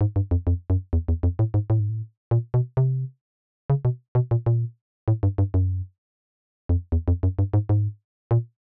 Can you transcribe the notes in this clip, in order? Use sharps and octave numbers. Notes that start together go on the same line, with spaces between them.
G#2
G2
F2
F2
F#2
E2
E2
F2
A2
G#2
A2
G#2
A2
A#2
B2
C3
C#3
B2
B2
A#2
A#2
A2
G2
G2
F#2
F2
E2
F2
F#2
G2
G#2
G#2
A#2